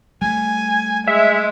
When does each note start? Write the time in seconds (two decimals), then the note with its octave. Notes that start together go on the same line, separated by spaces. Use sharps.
0.22 G3 A3 G#5
1.07 G#3 E5